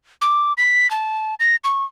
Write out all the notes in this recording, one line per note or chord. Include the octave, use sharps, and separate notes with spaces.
D6
B6
A5
A#6
C#6